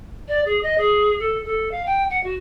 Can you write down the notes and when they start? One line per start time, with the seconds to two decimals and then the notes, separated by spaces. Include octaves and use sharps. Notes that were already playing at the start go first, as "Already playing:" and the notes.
0.28 D5
0.45 G#4
0.63 D#5
0.78 G#4
1.19 A4
1.44 A4
1.71 F5
1.85 G5
2.10 F#5
2.23 F#4